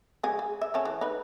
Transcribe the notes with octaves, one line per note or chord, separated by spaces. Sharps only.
C#3 G#3 G#5
G#4
E5
C#3 C#4 A5
E3
D#4 B4